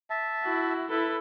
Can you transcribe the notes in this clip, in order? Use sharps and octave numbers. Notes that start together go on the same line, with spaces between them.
E5 A5
E4 F#4
E4 A4 B4